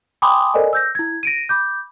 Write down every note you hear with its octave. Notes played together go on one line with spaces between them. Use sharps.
G5 G#5 B5 C6 D6 D#6
A4 A#4 C5 D5 D#5 G#5
E6 G6 A#6
E4 G#6
A#6 D7 D#7
B5 D6 G6